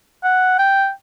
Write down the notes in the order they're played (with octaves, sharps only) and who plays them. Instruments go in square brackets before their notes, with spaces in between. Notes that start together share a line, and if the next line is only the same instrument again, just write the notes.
[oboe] F#5
G5